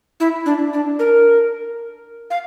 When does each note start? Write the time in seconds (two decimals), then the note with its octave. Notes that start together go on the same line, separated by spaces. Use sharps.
0.20 E4
0.46 D4
0.73 D4
0.99 A#4
2.30 F5